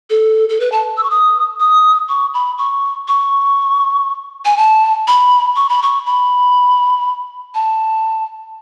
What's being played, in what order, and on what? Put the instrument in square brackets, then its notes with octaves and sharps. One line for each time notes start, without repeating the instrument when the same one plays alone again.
[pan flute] A4
A4
B4
A5
E6
C#6
D#6
D#6
C#6
B5
C#6
C#6
G#5
A5
B5
C#6
B5
C#6
B5
A5